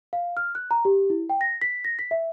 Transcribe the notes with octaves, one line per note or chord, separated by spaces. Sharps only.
F5
F6
F#6
A#5
G4
E4
G5
A#6
B6
A#6
B6
E5